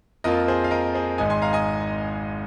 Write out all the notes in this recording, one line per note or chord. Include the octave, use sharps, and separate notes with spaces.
F2 F3 A#3 F4 A#4 D#5
G#4 C5
F5
A#4 D#5
G#4 C5
G#1 G#2 G#3 D#4 D#5 G#5
G#5 C6
F5 A#5
D#5 G#5